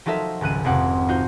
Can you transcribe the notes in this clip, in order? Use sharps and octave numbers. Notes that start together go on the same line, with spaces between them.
F3 F#3 D#4 A4 A#4 E5
G#1 C#2 F#6 D#7
F1 F2 C4 F#5 D6
D#4 F4 F#4 C5